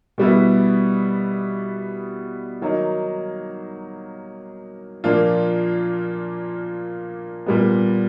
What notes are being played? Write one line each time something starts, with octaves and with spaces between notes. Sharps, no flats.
B2 G3 B3 E4
D#3 F#3 A#3 D#4
A#2 F3 A#3 D4 F4
A#2 G3 B3